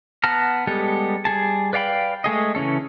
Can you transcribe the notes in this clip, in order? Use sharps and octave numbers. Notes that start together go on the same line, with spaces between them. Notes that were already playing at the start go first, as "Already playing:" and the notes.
B3 F#5 A5 A#5 F6
G3 G#3 B3 G4 A4
G3 G#4 A5
B4 D5 F5 G5 B5
G#3 A3 G#4 D#5
C#3 E3 C#4 A4